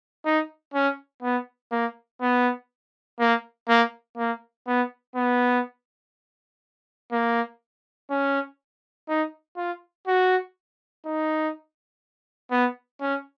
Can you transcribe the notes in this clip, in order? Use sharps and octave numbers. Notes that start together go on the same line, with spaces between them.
D#4
C#4
B3
A#3
B3
A#3
A#3
A#3
B3
B3
A#3
C#4
D#4
F4
F#4
D#4
B3
C#4